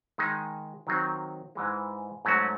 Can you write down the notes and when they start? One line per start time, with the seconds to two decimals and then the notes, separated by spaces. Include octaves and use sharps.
0.18 D#3 G#3 D#4
0.87 D#3 F#3 C4 D#4
1.55 G#2 E3 G#3
2.25 G#2 F#3 A3 C#4 F#4